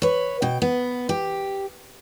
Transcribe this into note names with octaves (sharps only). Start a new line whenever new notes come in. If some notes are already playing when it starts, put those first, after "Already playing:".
B4 C#5
B2 G5
B3
G4